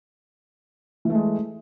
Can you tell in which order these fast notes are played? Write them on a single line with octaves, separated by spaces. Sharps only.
E3 A3 G#3